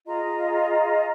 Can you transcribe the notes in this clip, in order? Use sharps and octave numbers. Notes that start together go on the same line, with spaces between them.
F4 G#4 D#5 A#5